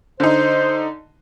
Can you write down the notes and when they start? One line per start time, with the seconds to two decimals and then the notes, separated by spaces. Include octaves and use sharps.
0.20 D3 D#4 C5